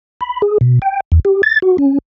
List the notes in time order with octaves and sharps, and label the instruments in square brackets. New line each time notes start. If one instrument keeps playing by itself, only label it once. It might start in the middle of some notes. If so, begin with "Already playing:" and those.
[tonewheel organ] B5
G#4
B2
G5
E2
G4
A6
F#4
C#4